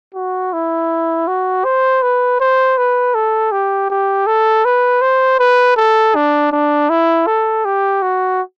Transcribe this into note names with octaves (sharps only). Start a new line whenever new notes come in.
F#4
E4
F#4
C5
B4
C5
B4
A4
G4
G4
A4
B4
C5
B4
A4
D4
D4
E4
A4
G4
F#4